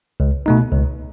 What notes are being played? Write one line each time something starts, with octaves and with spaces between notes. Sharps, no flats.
C#2
B2 A3 D#4
C#2